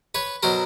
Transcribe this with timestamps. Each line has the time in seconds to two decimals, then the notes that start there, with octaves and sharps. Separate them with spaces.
0.15 B4 C#5
0.43 B2 F#3 A#4 C5